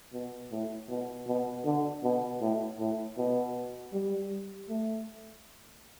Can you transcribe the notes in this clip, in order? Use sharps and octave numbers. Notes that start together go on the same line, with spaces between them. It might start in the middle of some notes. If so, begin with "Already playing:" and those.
B2
A2
B2
B2
D3
B2
A2
A2
B2
G3
A3